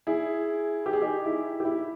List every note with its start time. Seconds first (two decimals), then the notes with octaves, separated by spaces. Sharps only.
0.07 E4 G#4
0.86 G4
0.93 G#4
1.02 D#4 G4
1.26 E4
1.60 G4
1.65 E4